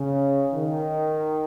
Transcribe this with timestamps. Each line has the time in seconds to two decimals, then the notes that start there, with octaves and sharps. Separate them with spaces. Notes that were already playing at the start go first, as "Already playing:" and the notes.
Already playing: C#3
0.54 D#3